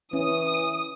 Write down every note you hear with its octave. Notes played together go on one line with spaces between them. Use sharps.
E3 C#4 D#6